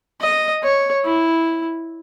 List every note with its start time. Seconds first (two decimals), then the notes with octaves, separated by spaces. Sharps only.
0.21 D#5
0.63 C#5
1.05 E4